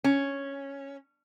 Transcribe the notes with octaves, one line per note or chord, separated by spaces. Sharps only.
C#4